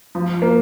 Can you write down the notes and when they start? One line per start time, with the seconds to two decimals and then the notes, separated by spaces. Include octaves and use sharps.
0.15 F3
0.42 A#3